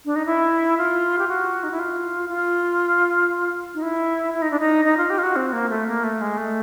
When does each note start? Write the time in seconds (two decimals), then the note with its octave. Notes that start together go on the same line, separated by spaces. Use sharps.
0.05 D4
0.16 D#4
0.26 E4
0.78 F4
1.19 G4
1.28 F#4
1.63 D#4
1.71 E4
1.79 F4
2.29 F4
3.74 D#4
3.82 E4
4.34 E4
4.42 D#4
4.51 D4
4.60 D#4
4.85 D#4
4.97 F4
5.10 G4
5.18 F4
5.23 F#4
5.36 C4
5.53 A#3
5.70 A3
5.87 A#3
6.04 A3
6.21 G#3
6.38 A3